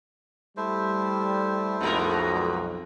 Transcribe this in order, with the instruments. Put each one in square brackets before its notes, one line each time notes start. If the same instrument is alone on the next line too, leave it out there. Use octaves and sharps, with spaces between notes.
[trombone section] G3 [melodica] A3 E4 C5
[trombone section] B1 F2 [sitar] B2 G#3 A#4